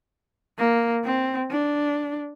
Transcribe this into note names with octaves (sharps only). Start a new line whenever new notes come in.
A#3
C4
D4